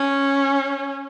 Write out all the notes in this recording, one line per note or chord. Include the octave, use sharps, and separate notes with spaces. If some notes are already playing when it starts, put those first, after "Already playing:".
Already playing: C#4